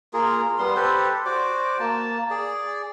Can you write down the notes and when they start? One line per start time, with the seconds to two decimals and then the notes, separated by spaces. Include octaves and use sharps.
0.13 A#3 F4 G#4 A#4
0.58 G3 B3 C6
0.76 G4 A4 B4 C5
1.26 F#4 C5 D5 D6
1.80 A#3 A5
2.31 G#4 D5